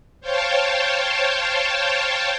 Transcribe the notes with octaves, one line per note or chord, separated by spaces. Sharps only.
C5 C#5 F5 G5 A5